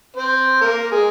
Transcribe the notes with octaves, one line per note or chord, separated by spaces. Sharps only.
C4 C5
A#3 A#4
G#3 G#4